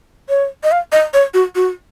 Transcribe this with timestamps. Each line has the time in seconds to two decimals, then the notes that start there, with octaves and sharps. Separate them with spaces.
0.29 C#5
0.64 D#5
0.72 F5
0.92 D#5
1.14 C#5
1.34 F#4
1.55 F#4